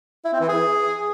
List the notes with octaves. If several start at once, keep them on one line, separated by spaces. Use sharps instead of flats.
E4
C4
E3
G#4